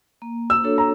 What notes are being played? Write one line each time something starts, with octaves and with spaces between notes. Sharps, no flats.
A#3
E6
D4 F#4 A4 C#5
A#5